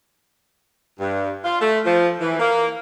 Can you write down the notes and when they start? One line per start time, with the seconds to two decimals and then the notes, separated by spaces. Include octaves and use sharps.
0.99 G2
1.44 F4
1.61 A3
1.84 F3
2.20 E3
2.39 A#3